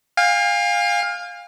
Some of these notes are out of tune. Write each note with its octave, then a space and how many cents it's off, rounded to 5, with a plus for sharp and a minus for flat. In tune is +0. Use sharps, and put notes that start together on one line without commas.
F5 +15 G#5 -45